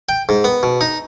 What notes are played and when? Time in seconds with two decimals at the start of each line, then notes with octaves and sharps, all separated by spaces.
0.09 G5
0.29 G#2
0.44 B3
0.63 B2
0.81 D#4